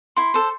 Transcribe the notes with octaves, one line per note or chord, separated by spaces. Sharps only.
E4 C6
A4 C5